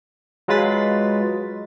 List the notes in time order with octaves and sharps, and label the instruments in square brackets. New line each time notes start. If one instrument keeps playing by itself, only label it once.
[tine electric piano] F#3 G#3 F4 B4 A6 B6